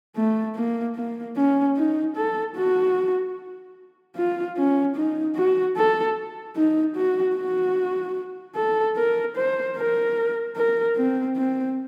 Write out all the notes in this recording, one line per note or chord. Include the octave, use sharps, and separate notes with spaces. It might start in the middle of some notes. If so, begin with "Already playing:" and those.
A3
A#3
A#3
C#4
D#4
A4
F#4
F4
C#4
D#4
F#4
A4
D#4
F#4
F#4
A4
A#4
C5
A#4
A#4
C4
C4